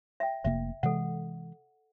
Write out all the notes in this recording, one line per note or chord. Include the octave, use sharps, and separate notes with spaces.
E5 G5
F1 C3 A#3 E5
C3 E3 G#3 A4 F#5